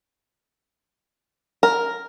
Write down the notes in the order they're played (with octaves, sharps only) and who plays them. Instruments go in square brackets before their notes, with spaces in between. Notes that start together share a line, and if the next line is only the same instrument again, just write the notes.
[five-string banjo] A#4